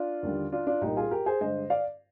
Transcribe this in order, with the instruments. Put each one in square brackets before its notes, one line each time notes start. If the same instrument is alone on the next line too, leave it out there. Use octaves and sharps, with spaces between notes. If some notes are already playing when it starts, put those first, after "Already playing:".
Already playing: [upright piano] D4 F4
D#2 D3 G3
D4 F4
D4 F4
C2 A#2 G3 D#4 G4
F4 G#4
G4 A#4
G#4 C5
G2 D3 G#3 C5 D#5
D5 F5